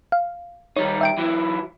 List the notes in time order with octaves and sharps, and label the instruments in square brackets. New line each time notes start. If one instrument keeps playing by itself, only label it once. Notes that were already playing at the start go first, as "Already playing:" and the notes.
[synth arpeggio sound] F5
[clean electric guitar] D#3 G3 D#4 [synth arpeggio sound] C#5
[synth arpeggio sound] E5 G5 D7
[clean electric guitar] E3 F#3 E4